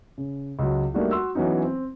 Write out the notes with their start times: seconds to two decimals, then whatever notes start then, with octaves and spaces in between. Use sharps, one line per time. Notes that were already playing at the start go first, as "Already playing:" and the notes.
0.18 C#3
0.59 C#2 F#3
0.94 G3 A3 A#3 D4 D#4 F#4
1.11 F#4 C6 E6
1.35 E3 F#3 B3 C#4 D#4
1.63 C4